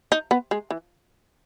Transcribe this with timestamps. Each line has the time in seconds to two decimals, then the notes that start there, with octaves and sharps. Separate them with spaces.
0.12 D#4
0.31 B3
0.51 G#3
0.71 E3